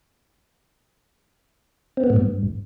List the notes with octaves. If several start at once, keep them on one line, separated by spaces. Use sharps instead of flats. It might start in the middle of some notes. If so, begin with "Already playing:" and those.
C4
B3
A2
G2